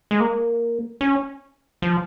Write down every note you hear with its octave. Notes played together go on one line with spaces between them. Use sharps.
G#3
A#3
C#4
F3